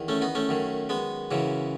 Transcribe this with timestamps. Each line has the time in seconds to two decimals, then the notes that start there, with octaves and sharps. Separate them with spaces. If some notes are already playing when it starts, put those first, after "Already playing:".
Already playing: E2 D#3
0.08 A3 C#4
0.22 B3 D#4
0.35 A3 C#4
0.49 F#2 D#3
0.89 G#3 B3
1.31 F#2 C#3 E3